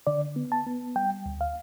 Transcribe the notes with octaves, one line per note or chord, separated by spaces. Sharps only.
D3 D5
B3
A5
B3
G3 G5
D2
F5